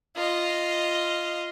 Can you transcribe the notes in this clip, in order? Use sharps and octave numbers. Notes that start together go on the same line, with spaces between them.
F4 D#5